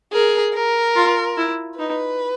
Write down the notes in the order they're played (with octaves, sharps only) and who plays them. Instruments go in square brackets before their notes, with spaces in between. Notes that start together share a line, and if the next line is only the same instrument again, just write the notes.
[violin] G#4 [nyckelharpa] A#4
[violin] A#4
[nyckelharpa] F4
E4
[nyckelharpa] D#4 [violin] B4